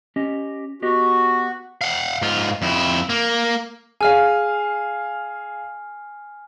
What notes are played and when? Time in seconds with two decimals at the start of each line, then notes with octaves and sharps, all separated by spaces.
0.16 C#4 G4 D#5
0.82 B3 F#4 G4 D#5
1.81 F5 F#5
2.22 G#2 F4
2.62 F2 E4
3.09 A#3
4.01 G#4 F5 G#5 F6